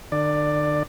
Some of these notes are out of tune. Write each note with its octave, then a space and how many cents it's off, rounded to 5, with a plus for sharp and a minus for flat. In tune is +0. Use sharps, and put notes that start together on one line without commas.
D3 +40 D5 +10